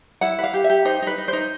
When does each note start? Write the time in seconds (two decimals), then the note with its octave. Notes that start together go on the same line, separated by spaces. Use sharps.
0.21 E4 F#5
0.39 B4
0.44 F5
0.54 G4
0.64 E5
0.70 G4
0.85 D#4 C5
1.02 D#4 B4
1.18 D#4
1.28 C5
1.33 D#4